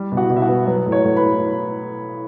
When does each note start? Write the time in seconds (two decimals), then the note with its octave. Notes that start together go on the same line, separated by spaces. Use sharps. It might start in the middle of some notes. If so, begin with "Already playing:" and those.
Already playing: G3
0.12 B2
0.17 F#4 F#5
0.30 B2
0.36 E5
0.42 F#4 F#5
0.48 B3
0.67 F#3 B4
0.86 A2
0.92 C#5
1.05 A2
1.17 B4 B5